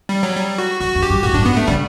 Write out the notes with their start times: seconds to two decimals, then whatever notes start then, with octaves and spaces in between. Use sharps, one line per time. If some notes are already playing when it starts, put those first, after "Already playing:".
0.09 G3
0.23 F#3
0.37 G3
0.58 F#4
0.80 F#2 F#4
0.95 F#2
1.02 G4
1.10 G2
1.24 A2 F#4
1.33 G2 D4
1.42 A2
1.46 B3
1.57 A3
1.67 C#3 G3